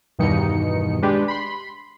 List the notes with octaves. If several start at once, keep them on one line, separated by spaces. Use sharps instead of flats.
E2 G2 B2 D#3 D#4 C#7
G#3 D4 G4 B4
B5 C6